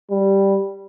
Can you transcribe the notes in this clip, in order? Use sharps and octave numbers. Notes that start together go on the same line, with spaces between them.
G3